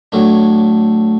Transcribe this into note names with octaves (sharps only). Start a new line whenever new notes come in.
A2 F#3 A3 D4